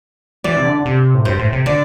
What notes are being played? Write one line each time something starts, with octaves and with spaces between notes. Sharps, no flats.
E3 D5
C3
D3
C3
A2
G2 C5
A2
C3
D3 D5